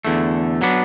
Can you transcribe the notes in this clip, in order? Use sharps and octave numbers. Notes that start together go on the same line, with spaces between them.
E2 D3 A3
F#3 B3 D4